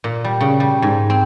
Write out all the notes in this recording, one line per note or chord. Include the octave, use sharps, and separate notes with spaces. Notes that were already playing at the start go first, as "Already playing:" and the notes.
A#2
G3
C#3
G3
G#2
C4